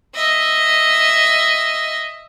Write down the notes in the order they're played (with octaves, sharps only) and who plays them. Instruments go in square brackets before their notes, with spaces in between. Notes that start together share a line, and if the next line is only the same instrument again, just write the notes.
[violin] D#5 E5